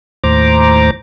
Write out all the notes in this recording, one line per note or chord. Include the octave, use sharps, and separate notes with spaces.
D#2 A2 C5 A#5 D6